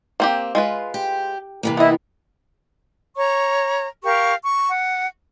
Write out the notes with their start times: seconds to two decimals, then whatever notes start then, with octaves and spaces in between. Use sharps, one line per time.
0.20 A#3 C4 G4
0.55 G#3 F4 B4
0.94 G4
1.63 C3 E3 A#3
1.77 B3 E4 D#5
3.17 C#5 A#5 C#6
4.04 G4 A#4 F5 C#6
4.43 C#6
4.69 F#5